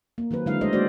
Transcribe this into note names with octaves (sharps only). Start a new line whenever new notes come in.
A#3
D#3 F#3 C4 B4
D3 F#3 G#3 E4 F5
G#3 A3 A4 C5 D#5
G#3 A#3 C#4 F#4 C5 D5